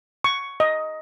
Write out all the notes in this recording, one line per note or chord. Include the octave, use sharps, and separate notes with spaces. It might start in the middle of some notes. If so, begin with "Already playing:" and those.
C#6
D#5